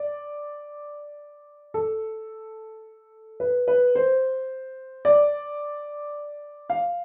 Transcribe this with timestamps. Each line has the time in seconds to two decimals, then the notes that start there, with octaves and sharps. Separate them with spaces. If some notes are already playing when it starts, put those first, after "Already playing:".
Already playing: D5
1.74 A4
3.40 B4
3.68 B4
3.95 C5
5.05 D5
6.70 F5